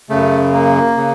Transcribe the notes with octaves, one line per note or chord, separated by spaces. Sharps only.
F#2 C#3 A3
A#3
C#3